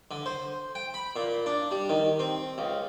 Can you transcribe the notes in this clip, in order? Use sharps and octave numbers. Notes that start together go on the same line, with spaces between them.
D3
C5
G5
B5
A#2
D4
G3
D#3
C4
C#2